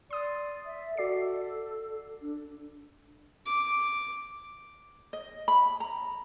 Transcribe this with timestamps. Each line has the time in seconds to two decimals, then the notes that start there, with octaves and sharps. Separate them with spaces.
0.11 D5 C6 D#6
0.66 E5
0.97 F#4 A4 D5 C7
2.22 D4
3.46 D6
5.13 D#5
5.48 B5
5.80 A#5